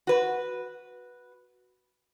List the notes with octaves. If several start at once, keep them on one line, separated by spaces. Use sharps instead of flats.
F#4 B4